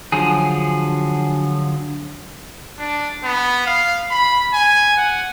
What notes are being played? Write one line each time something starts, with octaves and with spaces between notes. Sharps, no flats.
D3 F3 F#3 G#4
D4
B3
F5
B5
G#5
F#5